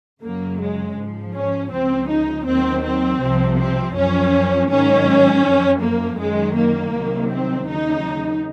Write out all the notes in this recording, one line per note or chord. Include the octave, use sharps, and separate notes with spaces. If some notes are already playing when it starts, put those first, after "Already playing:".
F#2 C#3 F#3 A#3
G#3
G#2 F3
C#4
C#2 C#3 F3 C4
D#4
D#2 D#3 F#3 C4
C4
C2 C3 F3
C4
F#2 F3 C#4
G#2 D#3 F#3 C#4
F#2 F3
A#3
F#2 D#3 F#3 G#3
A#3
C2 C3 D#3 F#3
C4
D#2 C#3 F#3 D#4